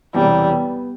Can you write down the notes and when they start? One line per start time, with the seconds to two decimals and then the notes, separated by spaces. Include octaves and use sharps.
0.14 E1 E2 C3 E3 G3
0.50 B3